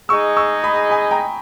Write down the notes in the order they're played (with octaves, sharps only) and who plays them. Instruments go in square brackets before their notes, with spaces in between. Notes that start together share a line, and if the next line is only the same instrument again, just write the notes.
[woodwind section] G#3 D#4 G#4 D#5 [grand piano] C#6 E6
[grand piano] C#6 E6
B5 D#6
G#5 B5
G5 A#5